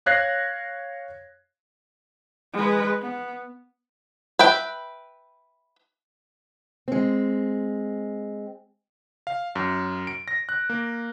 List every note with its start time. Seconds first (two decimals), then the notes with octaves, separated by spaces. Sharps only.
0.06 C#5 F5 F#6 G#6 A#6 C7
2.54 G#3 B4
3.01 B3
4.39 B4 E5 G5
6.88 G#3 C4
9.27 F5
9.55 F#2
10.07 D7
10.28 A#6
10.49 F#6
10.70 A#3